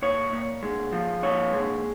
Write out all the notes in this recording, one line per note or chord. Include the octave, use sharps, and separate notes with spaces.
A#2 C#5
A#2
G#3
F3
A#2 C#5
G#3